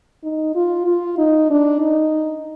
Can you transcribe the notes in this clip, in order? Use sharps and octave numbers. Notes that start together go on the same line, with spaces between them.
D#4
F4
F4
D#4
D4
D#4